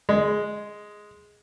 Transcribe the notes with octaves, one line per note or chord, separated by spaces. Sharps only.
G#3